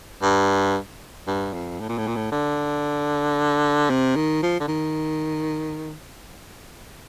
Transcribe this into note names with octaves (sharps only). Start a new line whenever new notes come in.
G2
G2
F2
A2
A#2
A2
A#2
A2
D3
C3
D#3
F3
D3
D#3